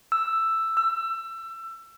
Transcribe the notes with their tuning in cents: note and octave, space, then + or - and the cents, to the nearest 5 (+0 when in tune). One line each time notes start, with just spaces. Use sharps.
E6 +5
E6 +25